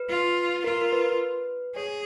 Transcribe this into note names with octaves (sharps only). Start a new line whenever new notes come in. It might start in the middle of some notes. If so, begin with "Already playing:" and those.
Already playing: B4
F4
F4 A#4
A#4
B4
G#4 C#5